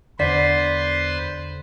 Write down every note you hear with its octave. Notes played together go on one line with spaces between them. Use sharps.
E2 D3 B4 C5 D5 C6 B6